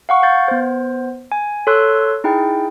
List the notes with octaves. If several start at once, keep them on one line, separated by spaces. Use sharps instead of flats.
F5 F#5 C#6
F5 G6 A6
B3 C5
G#5
A4 C#5 C6 E6 F#6
D#4 E4 G#4 G5